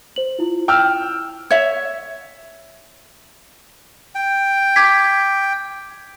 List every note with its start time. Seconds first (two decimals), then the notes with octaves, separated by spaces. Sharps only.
0.16 C5 F#7
0.39 E4 F4
0.68 G5 E6 F6
1.50 C#5 E5
4.15 G5
4.76 D6 G#6 B6